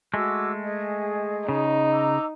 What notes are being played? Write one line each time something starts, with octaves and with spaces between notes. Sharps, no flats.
G#3 A3 F#4 D6 E6
G#4 D#5
C#3 D#4
A#5 D6 E6